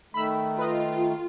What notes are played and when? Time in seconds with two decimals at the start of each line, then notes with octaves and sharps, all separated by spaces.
0.14 D#3 A3 B5 E6
0.58 F4 B4 D#5